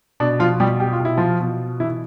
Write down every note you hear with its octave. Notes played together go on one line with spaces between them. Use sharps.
B2 D4
F3 F4
B2 G3 G4
G4
F4
B2 E4
F3 F4
B2
E3 E4